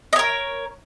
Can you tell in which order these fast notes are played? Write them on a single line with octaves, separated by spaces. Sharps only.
D#5 C#5 A#4